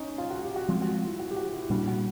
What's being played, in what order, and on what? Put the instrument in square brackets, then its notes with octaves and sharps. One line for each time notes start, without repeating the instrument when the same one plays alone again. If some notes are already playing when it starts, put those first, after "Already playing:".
Already playing: [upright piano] C#4 D#4
F4
F#4
G4
F#4
[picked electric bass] F3 G#3 C4 [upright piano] F4
[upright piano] F#4
F4
E4
F#4
G4
F#4
E4
G4
[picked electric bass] A#2 G3 A#3 D4 [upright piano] F#4
[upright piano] F#4